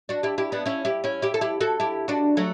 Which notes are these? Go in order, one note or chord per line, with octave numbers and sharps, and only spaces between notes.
D4 F#4
E4 G4
E4 G4
B3 D4
C#4 E4
E4 G4
C#4 E4
E4 G4
A4
E4 G4
F#4 A4
E4 G4
D4 F#4
F#3 A3